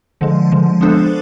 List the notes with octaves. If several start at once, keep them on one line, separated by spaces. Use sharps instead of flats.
D3 F3 G#3
D3 F3 G#3
G#3 B3 D4 A4 C5